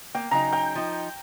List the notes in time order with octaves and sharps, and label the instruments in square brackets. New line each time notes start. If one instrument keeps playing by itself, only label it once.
[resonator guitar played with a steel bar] A#3 [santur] G5
[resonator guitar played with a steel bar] C#3 F#3 D#4 [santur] A#5
[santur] G5
[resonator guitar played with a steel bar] F3 D#4